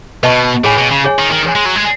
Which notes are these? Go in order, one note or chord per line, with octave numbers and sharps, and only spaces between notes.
B2 B4 D#5 A5 C#6
A2 G#4 C#5 G#5
B2
C#3
G#4 C#5 G#5
D#3
D#3
G#4 C#5 G#5
G#3
F#3
G#3